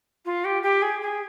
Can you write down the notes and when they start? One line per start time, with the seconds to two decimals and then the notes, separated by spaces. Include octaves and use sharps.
0.25 F4
0.44 G4
0.62 G4
0.82 G#4
1.01 G#4